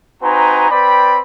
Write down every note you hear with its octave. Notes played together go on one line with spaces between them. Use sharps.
C4 D#4 F#4 B4 G#5 A#5
C4 B4 D5 G5 B5